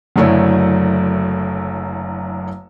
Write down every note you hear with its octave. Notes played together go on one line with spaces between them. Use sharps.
F#1 F#2 D3 A3 E4 C#5